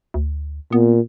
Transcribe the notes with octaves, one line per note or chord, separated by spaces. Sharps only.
D2
A#2 B3